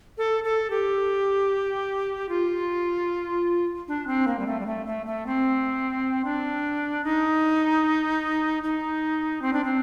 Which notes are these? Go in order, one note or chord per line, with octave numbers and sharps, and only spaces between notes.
A4
A4
G4
F4
D4
C4
A#3
G3
A3
G3
A3
A3
A3
C4
D4
D#4
D#4
C4
D4
C4